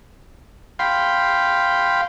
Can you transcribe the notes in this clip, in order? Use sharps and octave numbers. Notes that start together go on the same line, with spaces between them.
F5 G5 B5 C6